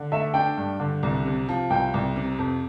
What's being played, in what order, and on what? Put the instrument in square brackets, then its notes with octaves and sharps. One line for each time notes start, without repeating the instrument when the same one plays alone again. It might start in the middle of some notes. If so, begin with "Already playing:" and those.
Already playing: [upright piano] D3
[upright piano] A3 [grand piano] E5
[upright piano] D4 [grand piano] G5
[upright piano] G2
D3
C2
C3
F3
[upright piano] C2 [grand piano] G5
[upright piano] C2
C3
F2